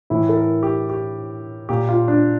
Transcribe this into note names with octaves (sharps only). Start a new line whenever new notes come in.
A2 E3 E4
A4
A#4
G4
G4
A#2 G4
F4
D4